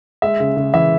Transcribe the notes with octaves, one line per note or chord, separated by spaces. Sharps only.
G#3 E5
C#3
C#3
E3 E5